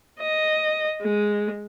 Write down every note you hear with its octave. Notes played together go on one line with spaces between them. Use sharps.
D#5
G#3